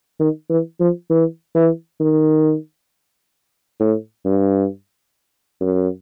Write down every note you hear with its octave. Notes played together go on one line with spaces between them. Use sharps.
D#3
E3
F3
E3
E3
D#3
A2
G2
F#2